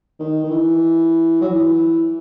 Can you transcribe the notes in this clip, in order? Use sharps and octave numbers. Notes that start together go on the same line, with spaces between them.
D#3
D#3
E3
F#3
E3